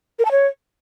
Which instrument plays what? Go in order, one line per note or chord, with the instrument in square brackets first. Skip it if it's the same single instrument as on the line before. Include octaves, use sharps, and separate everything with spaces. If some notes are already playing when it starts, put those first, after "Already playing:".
[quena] A#4
A5
C#5